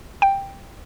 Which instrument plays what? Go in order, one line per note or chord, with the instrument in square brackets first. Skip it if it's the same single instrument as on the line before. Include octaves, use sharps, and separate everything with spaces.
[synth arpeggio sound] G5